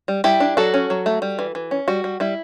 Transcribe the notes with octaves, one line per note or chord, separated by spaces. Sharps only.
G3
G3 E4 G4
D4
F#3 F#4 A4
C#4
F#3
A3
G3
E3
E3
C#4
G3 F#4
G3
G3 E4